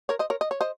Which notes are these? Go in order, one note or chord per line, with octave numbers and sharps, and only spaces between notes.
A#4 C#5
C5 D#5
A#4 C#5
D#5
C#5
C5 D#5